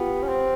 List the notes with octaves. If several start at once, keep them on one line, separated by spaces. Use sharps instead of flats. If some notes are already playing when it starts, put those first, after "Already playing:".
Already playing: B3 F4 G4
C#4
C4